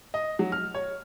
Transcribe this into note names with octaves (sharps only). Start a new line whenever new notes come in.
D#5
F#3
F6
C#5